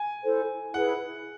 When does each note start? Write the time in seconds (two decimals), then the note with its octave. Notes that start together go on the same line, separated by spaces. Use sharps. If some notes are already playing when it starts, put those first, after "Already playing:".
Already playing: G#5
0.22 E4 A4 C5
0.74 E4 G#4 B4 F#5